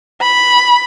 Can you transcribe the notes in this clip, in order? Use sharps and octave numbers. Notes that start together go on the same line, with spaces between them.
B5